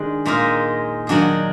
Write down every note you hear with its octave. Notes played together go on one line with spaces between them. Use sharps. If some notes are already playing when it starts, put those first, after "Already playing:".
Already playing: D#3 G#3 D4
A#2 G#3 D#4 A#4
D#3 F#3 D4 G#4